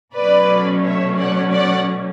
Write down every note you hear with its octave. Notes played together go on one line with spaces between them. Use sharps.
B2 F#3 A3 C#4 B4 D5
C#5 E5
D5 F#5
D5 F#5